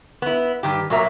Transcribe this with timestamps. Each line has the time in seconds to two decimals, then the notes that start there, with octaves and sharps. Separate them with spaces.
0.22 B3 E4
0.63 G2 D#3 G4
0.90 B1 F#3 A#3 A#4 E5